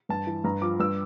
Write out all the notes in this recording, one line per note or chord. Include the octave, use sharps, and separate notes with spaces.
G2 A5
E3
G2 A#5
F3 D6
G2 E6